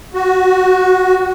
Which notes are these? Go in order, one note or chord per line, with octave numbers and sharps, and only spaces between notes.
F#4